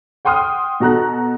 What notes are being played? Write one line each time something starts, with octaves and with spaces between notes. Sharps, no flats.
F#5 G5 C6 D#6 F6
B2 F#4 A4 A#5 F#6